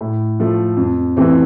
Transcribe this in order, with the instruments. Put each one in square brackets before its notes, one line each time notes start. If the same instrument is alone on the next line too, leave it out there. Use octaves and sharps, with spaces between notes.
[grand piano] A2
F3 A3
F2
C3 E3 A3 C4